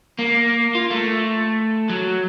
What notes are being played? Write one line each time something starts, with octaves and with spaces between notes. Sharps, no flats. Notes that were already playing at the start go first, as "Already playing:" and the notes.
A#3
F4
A3
F#3